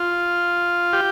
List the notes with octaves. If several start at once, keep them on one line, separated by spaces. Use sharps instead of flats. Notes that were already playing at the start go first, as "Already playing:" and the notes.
Already playing: F4
G4